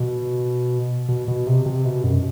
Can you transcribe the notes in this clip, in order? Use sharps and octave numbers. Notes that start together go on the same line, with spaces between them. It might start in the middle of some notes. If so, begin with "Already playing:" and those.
Already playing: B2
B2
B2
C3
C3
B2
F#2